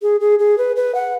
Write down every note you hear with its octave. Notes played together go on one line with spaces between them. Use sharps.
G#4
G#4
G#4
B4
B4
F#5